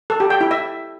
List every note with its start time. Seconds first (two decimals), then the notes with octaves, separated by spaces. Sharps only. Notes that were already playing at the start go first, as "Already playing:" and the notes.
0.10 A4
0.20 G4
0.30 G5
0.41 E4
0.51 E5